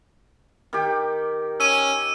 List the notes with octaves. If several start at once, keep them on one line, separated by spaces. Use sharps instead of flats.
D#3 G4
C#4 E6 D#7